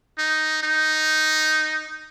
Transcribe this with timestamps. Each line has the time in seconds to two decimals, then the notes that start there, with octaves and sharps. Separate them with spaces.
0.18 D#4
0.63 D#4